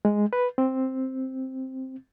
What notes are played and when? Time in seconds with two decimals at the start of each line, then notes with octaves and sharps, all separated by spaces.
0.05 G#3
0.33 B4
0.58 C4